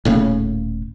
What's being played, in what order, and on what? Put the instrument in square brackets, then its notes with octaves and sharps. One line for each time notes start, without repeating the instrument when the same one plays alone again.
[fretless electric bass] D#1 A2 C#3